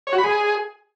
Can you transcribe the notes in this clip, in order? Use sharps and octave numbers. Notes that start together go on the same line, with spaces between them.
C#5
F#4
B5
G#4